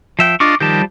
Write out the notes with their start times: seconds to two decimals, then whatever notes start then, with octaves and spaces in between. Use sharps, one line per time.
0.19 F3 E5 G5
0.40 D4 F4 D#5 C#6 D6
0.60 D#3 F3 G3 G4 A5